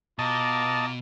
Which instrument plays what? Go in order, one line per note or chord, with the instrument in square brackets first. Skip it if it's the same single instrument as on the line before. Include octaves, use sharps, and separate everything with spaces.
[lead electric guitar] B2 [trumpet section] F4 A#5 D6 [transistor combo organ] D#5 A5